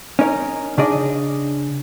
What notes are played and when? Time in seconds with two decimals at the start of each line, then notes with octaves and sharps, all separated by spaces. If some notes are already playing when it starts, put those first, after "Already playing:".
0.19 C#4 D#4 A#4
0.78 C#3 D4 G#4 D5 D#5